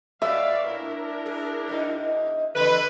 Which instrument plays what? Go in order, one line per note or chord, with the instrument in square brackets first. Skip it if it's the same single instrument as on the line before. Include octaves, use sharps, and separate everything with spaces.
[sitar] A2 B3 C#4 [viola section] D5 F5 [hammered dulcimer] E5
[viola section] D4 E4 A#4
[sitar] G#4
G#2 B2 D#4
[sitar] E2 G3 A4 [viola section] D3 C6 [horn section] B4